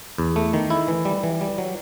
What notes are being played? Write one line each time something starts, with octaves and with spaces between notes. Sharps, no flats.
E2
A3
D#3
E4
E3
G3
E3
G3
F#3